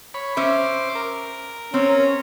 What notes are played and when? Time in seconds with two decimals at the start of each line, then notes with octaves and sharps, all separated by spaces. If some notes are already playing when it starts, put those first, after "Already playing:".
0.14 C#5 B5
0.37 C#4 C5 E5 D6
0.95 A#4
1.74 C4 C#4